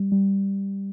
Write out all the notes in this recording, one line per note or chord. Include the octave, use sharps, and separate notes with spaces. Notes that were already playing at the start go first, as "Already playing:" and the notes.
Already playing: G3
G3